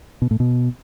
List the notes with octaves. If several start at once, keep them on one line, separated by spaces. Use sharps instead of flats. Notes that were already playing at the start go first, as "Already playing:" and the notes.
B2
A2
B2